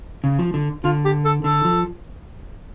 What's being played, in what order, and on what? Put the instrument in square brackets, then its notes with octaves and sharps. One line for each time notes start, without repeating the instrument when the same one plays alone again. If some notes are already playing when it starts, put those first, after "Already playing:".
[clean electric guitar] C#3
F3
D3
[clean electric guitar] D3 [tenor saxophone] F4
[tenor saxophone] G4
A4
[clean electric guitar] D3 [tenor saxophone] A4
[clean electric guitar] F3